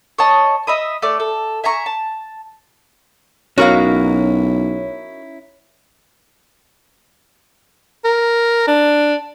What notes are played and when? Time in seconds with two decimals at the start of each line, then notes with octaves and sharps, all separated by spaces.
0.18 C#5 D#5 A5
0.67 D#5 E5 B5 D#6
1.02 A3 D5
1.20 A4
1.64 E5 G#5 A#5 C#6
1.86 A5
3.58 B1 C#4 D#4 E4 F#4 A#4 C#5 F5
8.04 A#4
8.68 D4